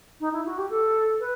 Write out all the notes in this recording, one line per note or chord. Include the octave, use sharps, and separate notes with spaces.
D#4
E4
F#4
G4
A4
B4